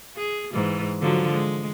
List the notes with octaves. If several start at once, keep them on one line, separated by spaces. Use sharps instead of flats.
G#4
G#2 E3
D3 F3 F#3
G#3